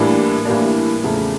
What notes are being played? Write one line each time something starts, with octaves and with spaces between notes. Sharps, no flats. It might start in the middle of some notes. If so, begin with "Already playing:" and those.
Already playing: A2 E3 G3 A#3 D4
A2 E3 G3 A#3 D4
E2 C#3 F3 A3